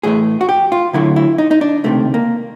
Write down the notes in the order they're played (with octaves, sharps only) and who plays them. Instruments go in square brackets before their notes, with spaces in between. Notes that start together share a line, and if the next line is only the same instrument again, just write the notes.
[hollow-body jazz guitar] A2 E3 A3 G#4
F#4
G4
F4
D2 D3 F#3 A3 E4
E4
D#4
D#4
D4
C#2 C3 D#3 A3
A#3